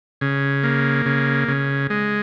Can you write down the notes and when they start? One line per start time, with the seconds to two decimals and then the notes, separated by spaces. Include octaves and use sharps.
0.21 C#3
0.63 A#3
1.06 C#3
1.48 C#3
1.90 G#3